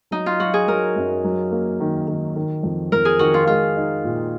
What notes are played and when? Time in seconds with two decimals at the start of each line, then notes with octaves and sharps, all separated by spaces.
0.11 F#3 D#4
0.26 F4
0.40 F#3 F#4
0.54 G#4
0.68 F#3 A#4
0.96 F#2
1.24 F#3
1.51 A#3
1.80 D#3
2.07 D#3
2.36 D#3
2.63 F2
2.92 F2 A#4
3.05 G#4
3.19 D#3 F#4
3.34 F4
3.47 G#3 F4
3.76 D#4
4.04 A#2